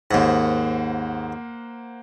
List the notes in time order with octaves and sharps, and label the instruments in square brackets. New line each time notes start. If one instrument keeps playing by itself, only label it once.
[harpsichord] D#2 G#2 [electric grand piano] A#3 C5 F#5